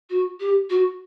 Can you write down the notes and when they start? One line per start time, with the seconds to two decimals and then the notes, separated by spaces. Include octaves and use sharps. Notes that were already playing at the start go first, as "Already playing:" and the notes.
0.10 F#4
0.40 G4
0.70 F#4